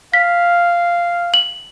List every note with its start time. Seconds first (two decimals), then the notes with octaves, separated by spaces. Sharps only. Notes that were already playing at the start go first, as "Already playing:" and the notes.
0.14 F5 B6
1.34 F#7